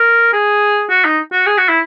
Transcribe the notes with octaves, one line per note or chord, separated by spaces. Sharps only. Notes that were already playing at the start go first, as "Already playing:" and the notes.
Already playing: A#4
G#4
F#4
D#4
F#4
G#4
F#4
E4